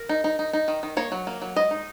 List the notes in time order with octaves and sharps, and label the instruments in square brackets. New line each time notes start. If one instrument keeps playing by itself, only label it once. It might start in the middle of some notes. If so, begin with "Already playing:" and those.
Already playing: [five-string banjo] A#4
D#4
D#4
D#4
D#4
D#3
D#3
A#3 C#5
F#3
A#3
F#3
G#3 D#5
D#4